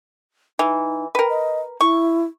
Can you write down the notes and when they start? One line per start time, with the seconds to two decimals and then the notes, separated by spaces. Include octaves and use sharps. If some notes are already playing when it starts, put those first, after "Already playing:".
0.59 E3 D#4
1.15 A#4 B4 G5
1.29 D#5
1.81 E4 C#6